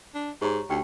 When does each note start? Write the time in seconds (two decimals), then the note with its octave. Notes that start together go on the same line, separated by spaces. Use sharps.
0.15 D4
0.42 G#2 G4 C#5 A#5
0.70 D2 D#4 G4 G5